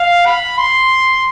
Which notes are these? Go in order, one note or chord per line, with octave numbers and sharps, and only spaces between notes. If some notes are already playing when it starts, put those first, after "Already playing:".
Already playing: F5
B5
C6